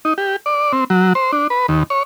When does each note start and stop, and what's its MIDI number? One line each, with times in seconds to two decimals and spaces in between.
0.05 0.14 63
0.18 0.36 67
0.46 0.72 74
0.73 0.84 60
0.90 1.13 54
1.15 1.32 72
1.32 1.47 62
1.50 1.66 71
1.68 1.83 39
1.90 2.03 73